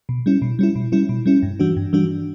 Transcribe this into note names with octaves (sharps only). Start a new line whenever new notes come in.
B2
G3 C#4 E4
B2
G3 C#4 E4
B2
G3 C#4 E4
B2
G3 C#4 E4
G2
E3 G3 D4 F#4
G2
E3 G3 D4 F#4